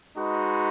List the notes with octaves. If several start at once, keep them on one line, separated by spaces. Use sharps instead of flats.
G#3 D#4 F#4 B4